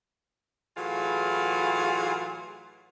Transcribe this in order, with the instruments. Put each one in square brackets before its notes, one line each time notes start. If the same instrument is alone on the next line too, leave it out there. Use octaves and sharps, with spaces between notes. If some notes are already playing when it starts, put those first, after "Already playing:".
[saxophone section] A2 E3 F#3 F4 G#4 F5